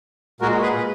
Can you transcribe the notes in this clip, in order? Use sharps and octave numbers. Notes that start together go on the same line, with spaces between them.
A#2 G#3 F#4 A#4
G#4 B4
B4